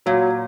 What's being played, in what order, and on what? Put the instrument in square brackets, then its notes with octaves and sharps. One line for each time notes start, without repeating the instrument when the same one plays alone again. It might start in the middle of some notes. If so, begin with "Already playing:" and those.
[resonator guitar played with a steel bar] A#2 [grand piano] F#3